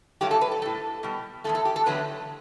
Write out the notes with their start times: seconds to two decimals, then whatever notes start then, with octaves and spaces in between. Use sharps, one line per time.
0.21 G2 F#3 A3 G4
0.31 A4
0.41 B4
0.51 A4
0.62 A2 G3 A4
1.03 B2 G3
1.44 E2 B2 A3 A4
1.55 A4
1.65 G4
1.76 A4
1.86 E2 D3 F#3 A3 B4